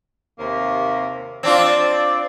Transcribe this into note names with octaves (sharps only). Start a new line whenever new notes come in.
D#2 C3 A#3
C4 D4 F4 D5